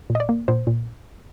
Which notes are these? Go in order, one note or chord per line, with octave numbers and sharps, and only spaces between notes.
A#2
D#5
D5
A#3
A#2 C5
A#2